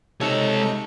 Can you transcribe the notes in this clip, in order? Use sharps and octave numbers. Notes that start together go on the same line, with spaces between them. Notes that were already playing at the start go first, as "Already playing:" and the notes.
C3 G#3 D#4 A4 C#5 C#7